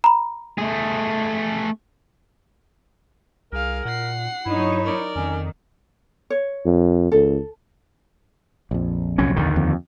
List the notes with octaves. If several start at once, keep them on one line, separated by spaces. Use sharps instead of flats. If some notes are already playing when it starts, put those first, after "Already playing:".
A#5 B5
A3 G#4
C2 G#4 A#4 F5
A#2 F#5 C7
G2 F#3 D#4 E4 C#5
A#4 D5
F2 D#3 C#4
C#5
F2
C#2 A4
A#1 F2
C2 F#3 C#4
D#2 D3 D#3
F2